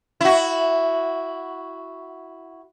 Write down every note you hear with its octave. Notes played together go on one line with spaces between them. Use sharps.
E4 F#4